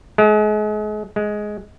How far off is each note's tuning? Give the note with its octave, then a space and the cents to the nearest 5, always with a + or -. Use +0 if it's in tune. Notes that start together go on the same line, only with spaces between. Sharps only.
G#3 +35
G#3 +10